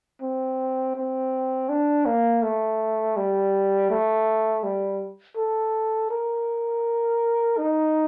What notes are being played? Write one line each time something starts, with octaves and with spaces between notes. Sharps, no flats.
C4
C4
D4
A#3
A3
G3
A3
G3
A4
A#4
D#4